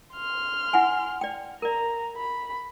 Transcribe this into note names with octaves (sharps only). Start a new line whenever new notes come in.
C6 F6
E4 F#5 G#5
D5 G5
A#4 D5 A#5
B5